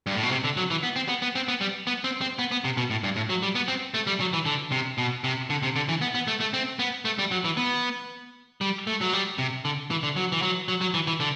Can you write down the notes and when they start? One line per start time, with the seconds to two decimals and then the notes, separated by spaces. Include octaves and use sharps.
0.07 G2
0.15 A2
0.23 B2
0.31 C3
0.44 D3
0.57 F#3
0.71 E3
0.83 B3
0.96 C4
1.08 B3
1.22 B3
1.35 C4
1.48 B3
1.61 G3
1.87 B3
2.04 C4
2.21 C4
2.39 B3
2.51 B3
2.65 C3
2.77 B2
2.90 A2
3.04 G2
3.16 A2
3.29 F#3
3.43 G3
3.55 B3
3.68 C4
3.94 A3
4.07 G3
4.20 F#3
4.33 E3
4.46 D3
4.72 C3
4.98 B2
5.24 C3
5.50 D3
5.63 C3
5.76 D3
5.89 E3
6.02 B3
6.15 B3
6.28 A3
6.40 A3
6.54 C4
6.79 B3
7.05 A3
7.19 G3
7.31 F#3
7.45 E3
7.57 B3
8.61 G3
8.87 A3
9.01 F#3
9.13 G3
9.38 C3
9.65 D3
9.91 E3
10.03 D3
10.16 F#3
10.32 E3
10.42 F#3
10.68 F#3
10.81 F#3
10.94 E3
11.07 E3
11.20 D3